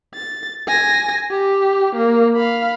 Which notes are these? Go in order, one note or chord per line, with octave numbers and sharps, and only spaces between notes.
A6
G#5 A#6
G4
A#3
F5 B5